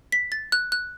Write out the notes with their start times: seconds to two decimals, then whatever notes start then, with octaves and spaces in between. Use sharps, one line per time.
0.12 B6
0.32 A6
0.52 F#6
0.72 F#6